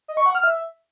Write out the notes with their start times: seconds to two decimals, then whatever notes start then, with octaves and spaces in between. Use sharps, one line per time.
0.08 D#5
0.17 C#6
0.26 F#5
0.35 F6
0.43 E5